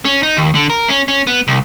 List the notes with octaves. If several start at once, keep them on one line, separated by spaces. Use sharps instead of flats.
C#4
D#4
D#2
D3
A#4
C#4
C#4
B3
C2